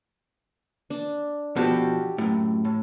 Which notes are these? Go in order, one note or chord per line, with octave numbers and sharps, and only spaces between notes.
D4
B2 F3 F#4 G4 A4
F#2 A2
A2